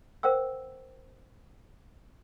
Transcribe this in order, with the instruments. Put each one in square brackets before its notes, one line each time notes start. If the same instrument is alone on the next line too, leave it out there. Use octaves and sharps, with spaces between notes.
[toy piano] A#4 C5 F#5 G5 E6